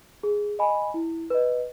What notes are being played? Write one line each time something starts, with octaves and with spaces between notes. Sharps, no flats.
G#4
D#5 G#5 B5
E4
B4 D#5